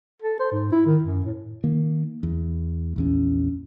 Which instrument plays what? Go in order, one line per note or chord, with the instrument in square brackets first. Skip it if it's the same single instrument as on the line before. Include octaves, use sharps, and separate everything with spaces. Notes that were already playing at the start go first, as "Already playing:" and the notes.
[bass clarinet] A4
C5
G#2
E4
D#3
F#2
A2
[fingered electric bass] D#3 A#3
E2
A#1 E2 C#4